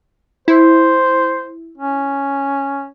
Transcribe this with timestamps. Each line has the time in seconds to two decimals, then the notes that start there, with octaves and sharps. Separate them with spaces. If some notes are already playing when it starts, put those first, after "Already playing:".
0.48 E4 C5
1.78 C#4